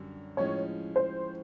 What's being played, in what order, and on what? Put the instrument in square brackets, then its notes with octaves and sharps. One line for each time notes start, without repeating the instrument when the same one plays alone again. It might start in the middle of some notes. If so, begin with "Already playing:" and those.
Already playing: [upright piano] F#2 D3 G3 C#4
[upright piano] A2 F3 G#3 C#4 [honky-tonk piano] C#5
[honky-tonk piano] C5